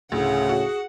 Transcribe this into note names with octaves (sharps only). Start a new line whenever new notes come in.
D2 A2 C#3 G#4 F#5
F#4